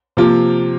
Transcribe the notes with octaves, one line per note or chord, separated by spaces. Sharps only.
C3 F3 A#3 F4